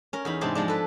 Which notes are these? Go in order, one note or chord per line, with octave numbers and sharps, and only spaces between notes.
C#4 A#4
E2 D#4 B5
G#2 C3 D4 C5 D5 C6
F3 G#3 D4
A4 B4